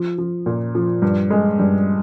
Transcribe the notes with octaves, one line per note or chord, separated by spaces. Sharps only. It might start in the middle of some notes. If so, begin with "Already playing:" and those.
Already playing: F3
F3
A#2
F3
G2
G#3
G2